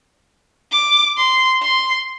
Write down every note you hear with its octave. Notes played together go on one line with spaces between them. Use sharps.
D6
C6
C6